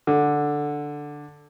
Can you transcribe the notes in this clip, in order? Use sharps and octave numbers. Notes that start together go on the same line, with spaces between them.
D3